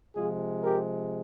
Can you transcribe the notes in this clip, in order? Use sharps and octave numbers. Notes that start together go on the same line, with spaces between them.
C3 F3 G#3 F4 G#4
G4 A#4